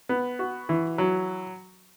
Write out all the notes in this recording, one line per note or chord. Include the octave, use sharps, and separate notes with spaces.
B3
F#4
E3
F#3